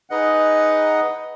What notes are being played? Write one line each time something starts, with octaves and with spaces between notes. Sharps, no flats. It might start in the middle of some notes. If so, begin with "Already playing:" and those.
D#4 G#4 B4 D#5 F#5